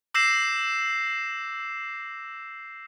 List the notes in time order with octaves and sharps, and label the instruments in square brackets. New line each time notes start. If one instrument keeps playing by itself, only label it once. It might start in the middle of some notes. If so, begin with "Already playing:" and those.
[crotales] D6 E6 G6 A#6 C7 E7